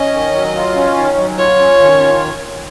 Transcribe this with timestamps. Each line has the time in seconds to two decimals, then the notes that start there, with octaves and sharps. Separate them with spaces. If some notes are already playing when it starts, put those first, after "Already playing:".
Already playing: C#4 D#5
0.13 D#3
0.35 F#3
0.56 F4
0.76 C#4
0.97 D#3
1.18 F#3
1.38 F4 C#5
1.59 C#4
1.80 D#3
2.00 F4